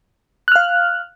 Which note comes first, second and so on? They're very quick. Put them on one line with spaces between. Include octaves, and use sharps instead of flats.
F#6 F6 F5